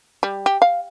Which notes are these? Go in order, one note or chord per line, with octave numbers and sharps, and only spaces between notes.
G3
G4
F5